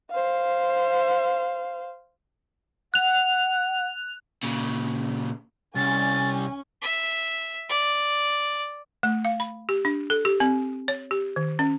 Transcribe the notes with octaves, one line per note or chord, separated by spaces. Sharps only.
C5 F5
F#5 F#6 F7
A#2 C#3
C2 C#4 G#5 A6
E5
D5
A3
F5
B5
G4
D4
A4
G4
C4
C#5
G4
D#3
C#4